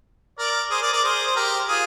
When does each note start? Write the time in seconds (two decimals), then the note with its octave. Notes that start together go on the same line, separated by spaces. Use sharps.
0.39 A#4 D5
0.71 G#4 C5
0.82 A#4 D5
0.93 A#4 D5
1.03 G#4 C5
1.27 C5
1.36 G4 A#4
1.68 F4 G#4